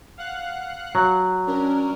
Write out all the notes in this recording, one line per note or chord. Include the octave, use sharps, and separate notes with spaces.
F5 F#5 F#6
F#3
C#4 D4 A#4